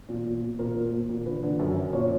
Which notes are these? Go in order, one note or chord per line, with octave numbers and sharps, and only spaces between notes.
A#2
A#2
A#2
A#2 A#4
A#2
A#2
A#2
D3 B4
D3
F#2
F#2
A#2 C#5